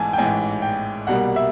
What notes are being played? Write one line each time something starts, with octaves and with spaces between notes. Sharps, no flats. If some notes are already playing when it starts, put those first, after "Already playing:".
Already playing: A1 G#2 E3 G#5 A5
G5
A1 G#2 E3 G#5
G5
C2 B2 G3 A#3 F#5
E5